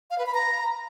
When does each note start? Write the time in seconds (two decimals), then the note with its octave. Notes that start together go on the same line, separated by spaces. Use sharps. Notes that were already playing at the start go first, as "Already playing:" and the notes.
0.10 F5
0.18 B4
0.26 B5
0.34 A#5